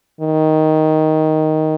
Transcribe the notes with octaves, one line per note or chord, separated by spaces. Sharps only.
D#3